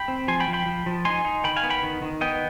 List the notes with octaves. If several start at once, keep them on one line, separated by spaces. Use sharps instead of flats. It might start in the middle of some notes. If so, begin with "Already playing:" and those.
Already playing: G5 B5
C4
F3 G#5 C6
G5 B5
F3
G5 B5
F3
F3
D#4 G#5 C6
D#4
D#3 G5 B5
F5 G#5
B3
G5 B5
D#3
D#3
B3 D#5 G5